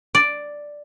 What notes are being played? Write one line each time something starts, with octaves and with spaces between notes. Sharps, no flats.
D5